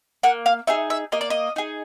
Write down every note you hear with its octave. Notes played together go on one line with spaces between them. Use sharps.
A#3 F#5
F5
D#4 G#4 E5
E5
A#3 D#5
D5
D#5
D#4 G#4